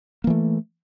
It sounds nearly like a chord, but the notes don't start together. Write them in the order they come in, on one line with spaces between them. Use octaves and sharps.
A#3 E3 A3